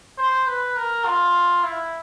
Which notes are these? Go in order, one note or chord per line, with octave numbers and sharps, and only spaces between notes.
C5
B4
A#4
F4
E4